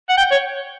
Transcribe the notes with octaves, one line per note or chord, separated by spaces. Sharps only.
F#5
G5
C#5